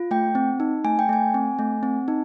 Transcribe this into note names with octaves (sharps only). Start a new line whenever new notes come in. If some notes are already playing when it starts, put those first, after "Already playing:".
Already playing: F4
A3 G5
C4
D#4
A3 G#5
G5
A3 G#5
C4
A3
C4
D#4